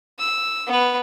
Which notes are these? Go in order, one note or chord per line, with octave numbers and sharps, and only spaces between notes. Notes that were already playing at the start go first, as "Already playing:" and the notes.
E6
B3 B4